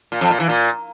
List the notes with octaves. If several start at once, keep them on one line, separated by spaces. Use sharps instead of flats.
A#2
F2
A#2
E3
A#2